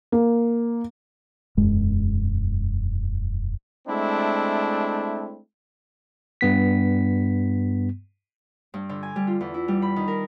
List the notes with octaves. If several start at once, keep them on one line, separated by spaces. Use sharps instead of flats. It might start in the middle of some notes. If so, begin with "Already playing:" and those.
A#3
E1 F#2 G#3
G#3 A3 C4 D4 E4
G2 B3 B6
G2
D3
G#5
G3
F4
E2
E4
G3
B5
D#3
A#4